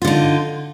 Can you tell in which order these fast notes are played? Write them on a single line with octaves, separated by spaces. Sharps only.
F4 D3 D#4